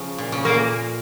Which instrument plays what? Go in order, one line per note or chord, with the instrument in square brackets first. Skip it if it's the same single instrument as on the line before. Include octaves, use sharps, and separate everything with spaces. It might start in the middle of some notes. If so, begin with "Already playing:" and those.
Already playing: [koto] C#3 F3
A#2
C#3
[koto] A#2 [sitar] A#3